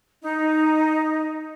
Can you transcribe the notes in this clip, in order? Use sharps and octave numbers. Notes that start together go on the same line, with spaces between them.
D#4